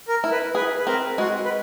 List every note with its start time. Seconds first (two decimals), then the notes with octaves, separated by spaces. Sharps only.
0.08 A#4
0.24 E4
0.31 B4
0.55 G#4 B4
0.79 B4
0.87 C4 A#4
1.18 G#3 F#4
1.45 B4